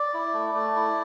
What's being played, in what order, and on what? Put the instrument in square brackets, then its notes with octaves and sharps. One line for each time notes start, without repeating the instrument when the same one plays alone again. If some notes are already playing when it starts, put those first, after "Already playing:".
Already playing: [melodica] D5
E4
A3
A3
E4